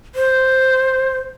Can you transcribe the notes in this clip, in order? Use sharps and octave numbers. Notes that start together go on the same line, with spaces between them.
C5